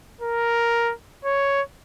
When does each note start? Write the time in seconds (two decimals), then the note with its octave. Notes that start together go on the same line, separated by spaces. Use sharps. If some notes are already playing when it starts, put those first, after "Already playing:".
0.21 A#4
1.25 C#5